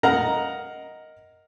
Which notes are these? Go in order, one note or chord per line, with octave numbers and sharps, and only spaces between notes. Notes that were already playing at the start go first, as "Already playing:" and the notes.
A#4 D#5 F5 F#5 A#5